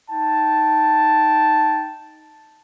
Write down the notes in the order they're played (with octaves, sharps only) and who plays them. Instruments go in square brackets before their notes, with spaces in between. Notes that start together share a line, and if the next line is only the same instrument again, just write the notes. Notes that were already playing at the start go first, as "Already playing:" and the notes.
[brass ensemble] D#4 G5 A5